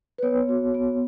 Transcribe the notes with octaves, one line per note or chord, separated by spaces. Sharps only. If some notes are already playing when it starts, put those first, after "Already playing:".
B4
B3 C#5
F#4
B3